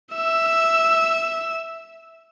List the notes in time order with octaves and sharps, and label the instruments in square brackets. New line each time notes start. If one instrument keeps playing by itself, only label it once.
[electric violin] E5 E6